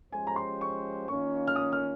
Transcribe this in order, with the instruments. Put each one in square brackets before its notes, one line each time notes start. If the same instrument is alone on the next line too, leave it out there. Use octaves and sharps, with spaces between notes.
[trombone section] F3 G#3 C#4 G4 C5 [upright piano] G#5
[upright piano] A#5
C6
C#6
[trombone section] D#3 A#3 C#4 F4 [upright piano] C#6
[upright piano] F6
D#6
F6